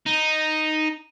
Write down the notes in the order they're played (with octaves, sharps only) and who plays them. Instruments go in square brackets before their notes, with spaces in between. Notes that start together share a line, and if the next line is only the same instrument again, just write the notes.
[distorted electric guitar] D#4